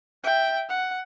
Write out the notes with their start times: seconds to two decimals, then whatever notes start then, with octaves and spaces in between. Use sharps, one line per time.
0.24 E5 G5
0.69 F#5